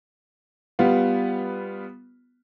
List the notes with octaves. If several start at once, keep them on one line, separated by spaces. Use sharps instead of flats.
G3 B3 F4